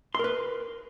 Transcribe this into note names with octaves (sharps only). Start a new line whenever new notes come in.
A#4 B4 C6